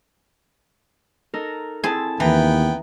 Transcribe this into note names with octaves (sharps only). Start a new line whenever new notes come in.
D#4 A4 A#4
C4 E4 G#4 A5
D#2 E3 B3 G5 A#5